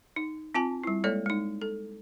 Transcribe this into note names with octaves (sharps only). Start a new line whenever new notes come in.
D#4
C4 F4 G#5 A5
G3 E4
G#3 A#3 A4 C#5 D5
G#3 D#4
A4